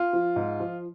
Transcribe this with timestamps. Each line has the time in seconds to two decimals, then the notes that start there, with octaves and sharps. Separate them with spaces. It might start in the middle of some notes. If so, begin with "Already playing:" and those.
Already playing: F4
0.13 F3
0.36 G#2
0.60 F3